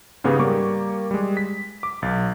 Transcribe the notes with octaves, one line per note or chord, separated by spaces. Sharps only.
G#2 C#3 B3 G4 G#4
G3 A#3 C#6 D6
G3 G#3
B6
D6
B1 A6